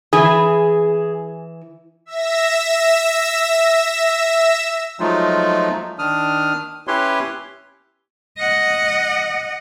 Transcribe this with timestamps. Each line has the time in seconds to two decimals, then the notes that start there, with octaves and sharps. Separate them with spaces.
0.13 E3 G#4
2.06 E5 E6 A#6
5.00 F3 F#3 G#3 A3 D#4 F4
5.99 D#3 D4 D#6 F6
6.87 C#4 E4 G4 B4 C#5 C6
8.38 D#5 F#5